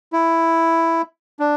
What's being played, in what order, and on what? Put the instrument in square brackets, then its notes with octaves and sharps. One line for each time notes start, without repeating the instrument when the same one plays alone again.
[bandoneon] E4
D4